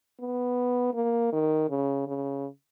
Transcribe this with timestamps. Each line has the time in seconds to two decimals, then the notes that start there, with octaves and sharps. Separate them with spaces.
0.20 B3
0.94 A#3
1.33 D#3
1.69 C#3
2.07 C#3